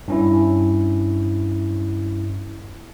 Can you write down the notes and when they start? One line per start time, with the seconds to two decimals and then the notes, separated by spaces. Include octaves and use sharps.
0.08 G2 C#4 E4